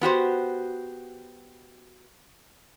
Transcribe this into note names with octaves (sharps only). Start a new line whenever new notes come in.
B3 F#4 G4 C5